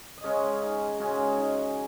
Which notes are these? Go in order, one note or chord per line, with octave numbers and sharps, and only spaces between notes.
D#5
C#3 G#3 C#4 G#4 C#5
D#4
C#3 G#3 C#4 F#4
D#4